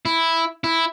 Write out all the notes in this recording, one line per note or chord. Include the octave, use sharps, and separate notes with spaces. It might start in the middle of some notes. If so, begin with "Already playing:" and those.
E4
E4